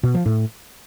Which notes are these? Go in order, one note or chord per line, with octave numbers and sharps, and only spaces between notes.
B2
F3
A2